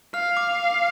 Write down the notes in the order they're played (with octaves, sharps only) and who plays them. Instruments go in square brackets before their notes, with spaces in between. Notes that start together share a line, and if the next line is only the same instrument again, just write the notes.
[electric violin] F5 [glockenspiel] F6
[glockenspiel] D6